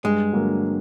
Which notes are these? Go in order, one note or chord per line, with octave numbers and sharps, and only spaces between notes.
G2 G#3
D3 F#3 A#3